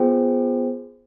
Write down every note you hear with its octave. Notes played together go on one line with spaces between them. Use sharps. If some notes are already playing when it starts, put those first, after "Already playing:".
Already playing: B3 F4 G#4 C5 G5